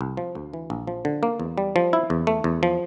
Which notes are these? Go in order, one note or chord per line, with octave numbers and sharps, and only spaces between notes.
C2
F3
D2
E3
A#1
F3
D3
A#3
E2
G3
F3
E4
E2
A3
E2
F3